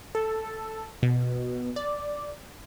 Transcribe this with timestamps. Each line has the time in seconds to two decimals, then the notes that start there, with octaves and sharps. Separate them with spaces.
0.15 A4
1.03 B2
1.76 D5